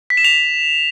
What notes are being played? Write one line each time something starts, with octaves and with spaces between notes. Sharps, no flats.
B6
E7
F7